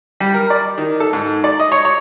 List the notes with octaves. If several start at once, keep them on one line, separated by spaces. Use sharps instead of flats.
G3
A#4
D5
D#3
A4
G#2
D5
D#5
C#5
C#5